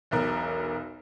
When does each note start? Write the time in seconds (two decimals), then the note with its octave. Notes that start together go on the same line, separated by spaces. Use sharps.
0.11 E1 B1 A#4